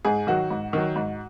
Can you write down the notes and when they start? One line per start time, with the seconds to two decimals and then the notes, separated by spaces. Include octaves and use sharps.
0.05 G#2 G#4
0.27 D#3 F#3 F#4
0.50 G#2
0.73 D#3 F#3
0.96 G#2